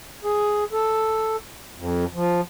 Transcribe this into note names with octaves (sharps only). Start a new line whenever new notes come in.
G#4
A4
F2
F3